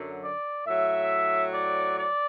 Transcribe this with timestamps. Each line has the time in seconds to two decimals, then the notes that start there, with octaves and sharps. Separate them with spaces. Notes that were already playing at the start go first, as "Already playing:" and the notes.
Already playing: F#2 D3 F#3
0.23 D5
0.66 A2 F#3 E5
1.53 D5
1.97 D5